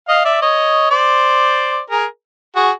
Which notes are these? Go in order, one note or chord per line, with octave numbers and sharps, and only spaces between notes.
D#5 F5
D5 E5
C#5 D#5
C5 D5
G#4 A#4
F#4 G#4